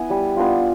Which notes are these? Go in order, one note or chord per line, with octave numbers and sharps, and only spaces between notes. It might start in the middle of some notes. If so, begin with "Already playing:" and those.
Already playing: B3 E4 G#5
G3
B3 D4 F4